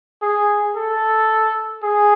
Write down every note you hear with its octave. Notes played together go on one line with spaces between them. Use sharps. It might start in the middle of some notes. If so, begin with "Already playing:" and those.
G#4
A4
G#4